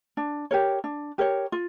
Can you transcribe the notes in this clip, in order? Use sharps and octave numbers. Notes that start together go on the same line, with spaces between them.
D4
G4 A#4 C#5
D4
G4 A#4 C#5
F4